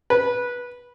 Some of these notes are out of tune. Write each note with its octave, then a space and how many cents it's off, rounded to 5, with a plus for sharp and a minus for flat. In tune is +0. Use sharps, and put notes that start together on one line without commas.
B4 -15